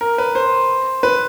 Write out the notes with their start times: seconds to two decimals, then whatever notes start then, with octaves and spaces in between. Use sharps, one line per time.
0.01 A#4
0.18 B4
0.35 C5
1.03 B4